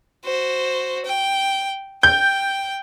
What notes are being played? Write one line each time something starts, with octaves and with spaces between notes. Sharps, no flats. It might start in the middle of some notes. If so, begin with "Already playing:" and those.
F#4 C5
G5
G5 G6